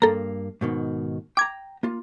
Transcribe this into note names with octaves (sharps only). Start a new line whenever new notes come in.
G2 A#3 A4 A#5
G#2 B2 D#3
G5 A#5 D6 G#6
A#3 F4